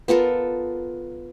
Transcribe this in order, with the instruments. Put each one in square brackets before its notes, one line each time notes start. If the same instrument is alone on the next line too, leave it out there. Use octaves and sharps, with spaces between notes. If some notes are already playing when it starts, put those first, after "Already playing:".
[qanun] B3 F4 A4 A#4